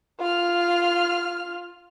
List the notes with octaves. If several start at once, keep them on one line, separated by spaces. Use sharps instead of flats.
F4 F6